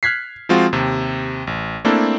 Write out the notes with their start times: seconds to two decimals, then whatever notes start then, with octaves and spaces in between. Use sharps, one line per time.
0.03 F6 F#6 G#6 B6 C7
0.49 F3 G#3 C4 F4 F#4
0.73 D#2 C3
1.47 A1
1.85 A3 A#3 C4 D4 E4 A4